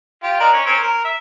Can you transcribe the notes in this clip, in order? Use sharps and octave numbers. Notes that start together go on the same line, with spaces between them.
F4 G4
D4 D#4 A#4
C#4
C4 C#4 A#4
A#4
E5